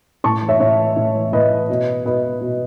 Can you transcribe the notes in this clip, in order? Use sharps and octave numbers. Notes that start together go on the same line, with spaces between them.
A2 A5 C#6
E3
C#5 E5
A2 C#5 E5
E3
A2
E3
A2 B4 D#5
E3
B2
B2 B4 D#5
B2